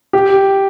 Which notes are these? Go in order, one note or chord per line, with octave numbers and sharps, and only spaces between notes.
G4